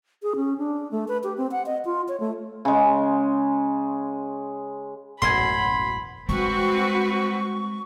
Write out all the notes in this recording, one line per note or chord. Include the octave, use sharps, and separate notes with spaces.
G#4
C#4
D4
A3
B4
G4
C4
F#5
D#5
F4
C#5
A3
C#3 G#3
E1 A1 F#2 F#4 G#5 B5 C6
G3 G#3 C4 F#4 B4 C#6